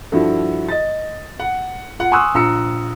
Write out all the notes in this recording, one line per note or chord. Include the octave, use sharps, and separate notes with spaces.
G2 F3 E4 F#4 A4
D#5 A6
F#5
F4 F#5
G#5 C6 C#6 D#6 E6 F#6
A#1 F4 A#5 E6 C#7